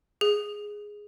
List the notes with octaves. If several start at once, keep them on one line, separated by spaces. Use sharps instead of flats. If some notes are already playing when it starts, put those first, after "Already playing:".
G#4